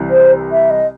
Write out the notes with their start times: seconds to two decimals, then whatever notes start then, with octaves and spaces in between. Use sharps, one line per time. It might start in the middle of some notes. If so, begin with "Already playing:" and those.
Already playing: C2 C3 E3
0.10 C5
0.52 E5
0.70 D#5